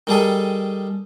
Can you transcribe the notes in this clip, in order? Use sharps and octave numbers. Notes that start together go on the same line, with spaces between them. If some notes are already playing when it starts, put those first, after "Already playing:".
D#3 G3 G#4 A4